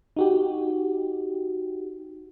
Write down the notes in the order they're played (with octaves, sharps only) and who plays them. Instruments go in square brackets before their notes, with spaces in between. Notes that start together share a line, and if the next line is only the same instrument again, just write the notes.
[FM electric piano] D#4 F#4 G4